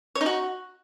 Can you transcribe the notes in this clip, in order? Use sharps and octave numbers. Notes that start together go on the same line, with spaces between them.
C#5
D#4
F#4